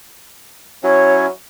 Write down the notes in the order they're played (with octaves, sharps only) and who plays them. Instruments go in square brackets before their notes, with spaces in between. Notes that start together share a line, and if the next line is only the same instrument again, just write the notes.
[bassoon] F#3 [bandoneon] C#4 E4 [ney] C#5